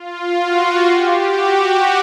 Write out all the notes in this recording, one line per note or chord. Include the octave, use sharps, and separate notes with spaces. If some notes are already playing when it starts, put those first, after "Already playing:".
Already playing: F4
F#4
G4
F#4